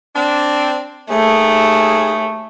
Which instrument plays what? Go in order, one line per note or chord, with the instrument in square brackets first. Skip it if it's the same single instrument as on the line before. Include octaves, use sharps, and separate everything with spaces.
[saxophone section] C4 D4
[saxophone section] D#2 G#4 [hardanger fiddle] A3